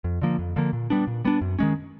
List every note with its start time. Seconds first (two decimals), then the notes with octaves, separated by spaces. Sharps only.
0.04 F2
0.22 D3 F3 A#3
0.39 F2
0.56 D3 F3 A#3
0.73 A#2
0.90 G3 B3 D4
1.07 A#2
1.25 G3 B3 D4
1.41 F#2
1.59 D#3 G#3 C#4